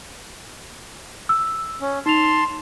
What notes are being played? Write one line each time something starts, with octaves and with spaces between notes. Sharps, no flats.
E6
C#4
D#4 A5 C6 F7